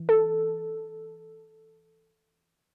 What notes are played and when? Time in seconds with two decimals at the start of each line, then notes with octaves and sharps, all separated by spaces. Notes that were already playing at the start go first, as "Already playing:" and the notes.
Already playing: E3
0.09 A4